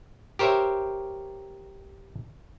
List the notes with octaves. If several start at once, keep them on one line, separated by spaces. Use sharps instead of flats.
G4 A#4 C5 C#5 E5